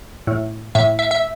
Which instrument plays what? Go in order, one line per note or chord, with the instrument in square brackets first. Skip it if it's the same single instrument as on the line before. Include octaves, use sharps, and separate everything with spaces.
[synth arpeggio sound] A2
A2 E5
E5
E5